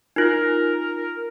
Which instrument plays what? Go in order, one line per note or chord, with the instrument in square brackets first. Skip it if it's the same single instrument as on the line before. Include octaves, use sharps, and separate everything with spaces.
[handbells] D#4 F4 [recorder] A#4